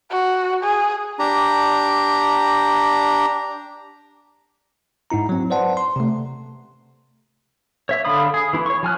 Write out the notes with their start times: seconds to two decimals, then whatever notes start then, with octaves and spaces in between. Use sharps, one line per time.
0.10 F#4
0.64 G#4
1.19 D4 G4 A#5
5.10 G#2 D#4 E4 A#5
5.29 F#3 C4
5.50 B4 C5 D5 F#5 A5 C6
5.77 C6
5.96 C3 A3
7.89 C#5 E5
8.05 D3 D4 F5 B5 D#6
8.34 G#4
8.53 E3 E4
8.66 C#5 C#6
8.83 F3 G#5 F6 F#6